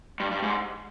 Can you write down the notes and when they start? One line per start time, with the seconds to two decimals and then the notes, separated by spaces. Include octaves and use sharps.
0.20 G2
0.31 G2
0.42 G#2